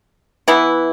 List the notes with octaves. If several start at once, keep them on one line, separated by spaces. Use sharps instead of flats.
E3 B3 E4